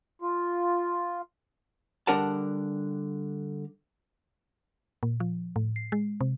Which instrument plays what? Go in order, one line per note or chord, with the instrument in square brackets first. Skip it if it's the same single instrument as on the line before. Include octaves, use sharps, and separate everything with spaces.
[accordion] F4
[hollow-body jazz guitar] D3 G3 D4 A#4 F#5 A5
[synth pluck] A#2
F3
A2
C7
G#3
C3